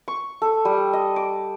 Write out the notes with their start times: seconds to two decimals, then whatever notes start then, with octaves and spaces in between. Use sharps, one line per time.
0.08 C#6
0.42 A4
0.65 G3
0.93 D#5
1.16 D6